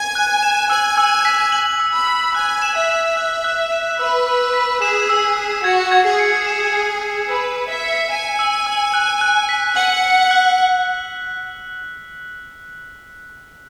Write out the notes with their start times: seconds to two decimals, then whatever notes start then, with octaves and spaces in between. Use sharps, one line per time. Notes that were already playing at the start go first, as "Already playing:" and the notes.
Already playing: G#5
0.15 F#6
0.43 E7
0.70 G#5 E6
0.98 E6
1.25 B6
1.52 F#7
1.80 E6
1.94 B5
2.07 E6
2.34 G#5 F#6
2.62 E7
2.76 E5
2.90 E7
3.17 F#6
3.44 F#6
3.72 E7
3.99 B4 E6
4.27 E6
4.54 B6
4.82 G#4 E7
5.09 E6
5.37 E6
5.64 F#4 G#6
5.92 G#6
6.06 G#4
6.19 C#7
6.47 E7
6.74 G#6
7.02 G#6
7.29 B4 E6
7.57 E6
7.70 E5
7.84 C#7
8.12 G#5 E7
8.39 E6
8.67 E6
8.94 F#6
9.21 F#6
9.49 B6
9.76 F#5 F#7
10.03 F#6
10.31 F#6